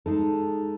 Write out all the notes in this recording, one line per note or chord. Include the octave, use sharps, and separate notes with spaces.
G#3 D#4 A4